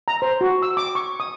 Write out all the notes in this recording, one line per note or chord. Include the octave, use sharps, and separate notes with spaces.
A#5
C5
F#4
E6
D6
C#6
D#6